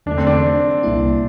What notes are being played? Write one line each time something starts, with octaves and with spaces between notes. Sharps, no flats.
E2 D3 A3 D4
C4
D4
C2 A#2 G3 A#3 E4